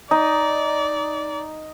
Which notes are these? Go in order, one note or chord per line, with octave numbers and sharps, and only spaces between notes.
D#4 D5